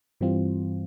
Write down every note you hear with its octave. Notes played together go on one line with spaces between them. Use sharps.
G2 E3 G3 C4 F4